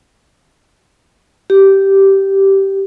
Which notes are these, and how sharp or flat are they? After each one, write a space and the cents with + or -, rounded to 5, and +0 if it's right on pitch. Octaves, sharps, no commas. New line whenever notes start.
G4 -10